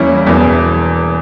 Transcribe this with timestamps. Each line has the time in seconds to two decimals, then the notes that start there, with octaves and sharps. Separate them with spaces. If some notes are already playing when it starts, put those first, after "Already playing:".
Already playing: E2 E3 G3 A#3 C#4 E4
0.26 E1 E2 E3